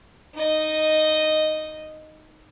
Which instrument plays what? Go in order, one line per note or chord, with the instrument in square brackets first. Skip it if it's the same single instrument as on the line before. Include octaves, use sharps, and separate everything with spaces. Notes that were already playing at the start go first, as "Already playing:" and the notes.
[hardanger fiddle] D#4 D#5